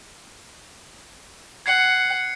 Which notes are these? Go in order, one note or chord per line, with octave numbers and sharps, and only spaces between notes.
F#5 G#6 C7 C#7